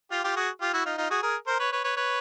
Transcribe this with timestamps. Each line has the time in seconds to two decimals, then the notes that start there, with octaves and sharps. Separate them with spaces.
0.11 F4 G4
0.24 F4 G4
0.36 F#4 G#4
0.61 F4 G4
0.73 E4 F#4
0.86 D#4 F4
0.98 D#4 F4
1.10 F#4 G#4
1.22 G#4 A#4
1.47 A#4 C5
1.60 B4 C#5
1.72 B4 C#5
1.84 B4 C#5
1.97 B4 C#5